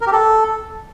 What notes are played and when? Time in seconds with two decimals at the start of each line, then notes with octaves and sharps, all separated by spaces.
0.01 A#4
0.07 G4
0.12 A4